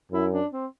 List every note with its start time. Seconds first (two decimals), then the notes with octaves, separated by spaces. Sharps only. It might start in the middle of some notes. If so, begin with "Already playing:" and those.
0.12 F#2 E4
0.32 D4
0.52 C4